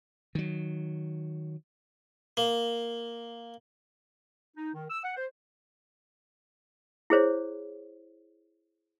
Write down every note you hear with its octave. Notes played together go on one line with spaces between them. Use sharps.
D#3 F#3
A#3
D#4
D#3
E6
F#5
C5
E4 G#4 C5 C#5